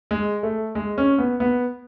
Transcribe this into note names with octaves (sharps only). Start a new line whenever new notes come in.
G#3
A3
G#3
C#4
B3
B3